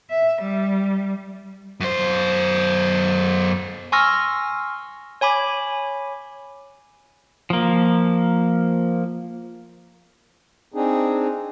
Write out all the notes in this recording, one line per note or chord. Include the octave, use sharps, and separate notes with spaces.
E5
G3
F#2 C5
G#5 C6 C#6 E6 F6 A#6
C#5 G#5 B5 D6
F3 A#3
C4 D4 D#4 G#4